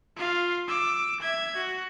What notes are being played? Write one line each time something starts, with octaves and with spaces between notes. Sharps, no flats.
F4 F5
D6 E6
E5 G#6
F#4